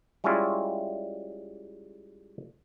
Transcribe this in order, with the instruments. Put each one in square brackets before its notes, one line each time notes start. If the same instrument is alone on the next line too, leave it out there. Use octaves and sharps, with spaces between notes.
[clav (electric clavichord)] G3 G#3 C#4 E4 F4